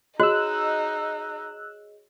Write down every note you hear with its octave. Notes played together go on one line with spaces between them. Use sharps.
D#4 F#4 G#4 C#5 D#5 E6 F#6